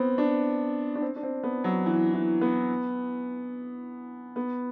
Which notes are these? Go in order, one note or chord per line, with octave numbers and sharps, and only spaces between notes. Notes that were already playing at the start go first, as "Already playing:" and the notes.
Already playing: B3 C4
D4
D4
C4
D4
C4
B3
F#3
E3
E3
B3
B3